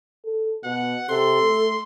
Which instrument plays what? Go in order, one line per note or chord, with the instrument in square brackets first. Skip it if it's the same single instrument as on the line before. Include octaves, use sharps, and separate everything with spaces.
[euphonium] A4
[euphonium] B2 [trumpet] F#5
[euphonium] C3 [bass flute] A4 [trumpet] C6
[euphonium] A3